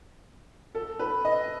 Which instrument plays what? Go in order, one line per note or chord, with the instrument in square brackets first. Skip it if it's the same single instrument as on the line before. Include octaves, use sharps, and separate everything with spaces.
[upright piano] A4
B4
D#5